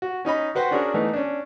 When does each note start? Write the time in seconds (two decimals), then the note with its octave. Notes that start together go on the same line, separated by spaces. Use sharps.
0.02 F#4
0.25 C#4 D#4 D#5 B5
0.55 F#4 B4 C5 F#5 G5
0.71 C#4 D4 F#4 G#4 A#4
0.94 E3 A3 B3 D#4
1.13 C#4 D4